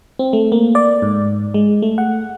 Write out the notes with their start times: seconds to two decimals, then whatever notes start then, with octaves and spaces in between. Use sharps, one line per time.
0.19 C4
0.33 A3
0.52 A#3
0.75 D5
1.02 G#2
1.54 G#3
1.82 A3
1.98 F#5